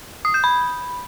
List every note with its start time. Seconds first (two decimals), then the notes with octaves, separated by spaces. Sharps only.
0.25 D#6
0.34 G6
0.44 B5